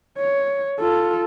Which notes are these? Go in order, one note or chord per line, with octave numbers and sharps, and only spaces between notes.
C#5
F4 A4